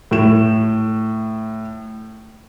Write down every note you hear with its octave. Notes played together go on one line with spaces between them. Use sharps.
A2 E7